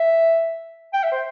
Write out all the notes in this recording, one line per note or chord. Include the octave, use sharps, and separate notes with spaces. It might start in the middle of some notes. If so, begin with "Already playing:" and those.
Already playing: E5
G5
E5
C5